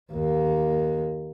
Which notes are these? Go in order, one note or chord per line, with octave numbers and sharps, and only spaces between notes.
D#2 A#3